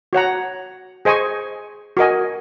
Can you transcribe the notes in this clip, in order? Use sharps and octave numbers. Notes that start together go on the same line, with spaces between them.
F#4 C#5 F#5 A#5
G#4 C5 D#5 G#5 C#6
F#4 A#4 D#5 G#5